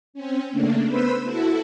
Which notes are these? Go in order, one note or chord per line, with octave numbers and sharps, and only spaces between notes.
C4 C#4
C#3 A3 A#3 D4
B3 B4 C5 B5 E6
E4 F#4 A4